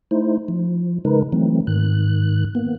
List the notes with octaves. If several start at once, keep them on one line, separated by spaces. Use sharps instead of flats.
A3 D#4 E4 C5
F3
C#3 G#3 D#4 A#4 B4
E3 F#3 A3 C4
G#2 D#3 F#6
A#3 B3